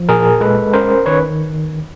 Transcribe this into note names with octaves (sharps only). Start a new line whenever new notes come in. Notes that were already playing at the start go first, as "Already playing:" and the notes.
Already playing: F3
A#2 G#4 A#4
G#3 A4 B4
C#4 A#4 C5
D#3 B4 C#5